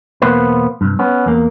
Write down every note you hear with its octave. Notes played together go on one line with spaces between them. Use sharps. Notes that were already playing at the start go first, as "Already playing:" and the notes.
E2 B2 A#3 B3 B4 C5
C2 G2
B3 C#4
E2 A#3